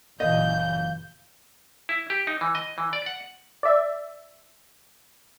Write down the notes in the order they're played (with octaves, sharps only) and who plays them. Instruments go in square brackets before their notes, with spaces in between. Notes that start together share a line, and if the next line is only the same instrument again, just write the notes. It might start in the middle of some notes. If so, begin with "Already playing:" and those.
[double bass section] F#1 A#2 E3 [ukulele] D#5 [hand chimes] F5 [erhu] G6
[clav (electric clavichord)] E4
G4
D#4
E3
D#5
E3
D5
F#5
[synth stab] D5 E5